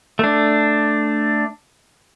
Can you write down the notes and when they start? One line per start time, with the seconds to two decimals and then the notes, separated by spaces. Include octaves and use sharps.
0.19 A3 D4